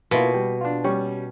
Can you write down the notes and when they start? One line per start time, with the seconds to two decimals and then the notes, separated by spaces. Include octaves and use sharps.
0.11 B2 A#3 E4 F4
0.34 G3
0.61 D4 F4
0.84 G3 C#4 C#6